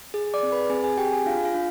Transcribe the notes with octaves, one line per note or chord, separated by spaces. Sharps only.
G#4
D5 D6
C4
B4 B5
C4 G#4 G#5
G#4 G#5
C4 G4 G5
G#4 G#5
D4 F4 F5
F4 F5
D4